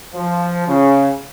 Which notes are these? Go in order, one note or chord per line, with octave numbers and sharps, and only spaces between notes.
F3
C#3